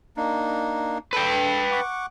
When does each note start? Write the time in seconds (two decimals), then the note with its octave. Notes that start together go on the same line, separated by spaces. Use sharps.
0.17 A#3 D4 D#4
1.13 A4 B4 G5
1.72 F#5 C#6 D6